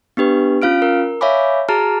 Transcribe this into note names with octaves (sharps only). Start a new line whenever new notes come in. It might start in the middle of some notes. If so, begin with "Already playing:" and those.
B3 D4 G4 B4
C#4 F4 F5 F6 D7
A#4
C#5 E5 F5 G#5 B5 D6
F#4 G#4 A5 A#5 F6